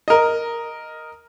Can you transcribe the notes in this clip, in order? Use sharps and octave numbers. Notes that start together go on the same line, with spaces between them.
A#4 D#5